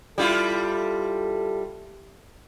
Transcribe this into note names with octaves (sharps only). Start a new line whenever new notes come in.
G3 E4 F4 A4